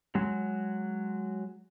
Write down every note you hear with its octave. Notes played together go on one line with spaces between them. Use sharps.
F#3 G#3 F#4